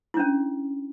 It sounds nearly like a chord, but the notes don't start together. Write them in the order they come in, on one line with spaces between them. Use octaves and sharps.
E4 D4 C#4